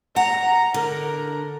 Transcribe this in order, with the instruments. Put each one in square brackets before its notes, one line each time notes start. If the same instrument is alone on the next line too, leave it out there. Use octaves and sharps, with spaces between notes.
[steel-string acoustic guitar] F#5 [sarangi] A#5
[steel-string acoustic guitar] D3 [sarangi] A#4